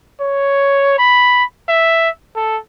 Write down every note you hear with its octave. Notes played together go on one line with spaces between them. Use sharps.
C#5
B5
E5
A4